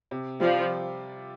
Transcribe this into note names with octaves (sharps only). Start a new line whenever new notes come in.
C3
F3 G3 F4 D5 F5